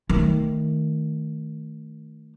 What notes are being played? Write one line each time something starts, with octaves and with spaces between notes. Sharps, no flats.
D#3 A3